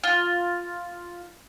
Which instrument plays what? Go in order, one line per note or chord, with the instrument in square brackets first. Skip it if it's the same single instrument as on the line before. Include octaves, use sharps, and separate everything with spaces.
[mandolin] F4